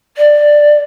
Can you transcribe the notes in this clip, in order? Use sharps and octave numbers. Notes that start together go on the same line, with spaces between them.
D5